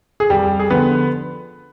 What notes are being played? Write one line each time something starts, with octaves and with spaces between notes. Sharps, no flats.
G#4
F2 G3 G4
G#4
D3 F3 B3 B4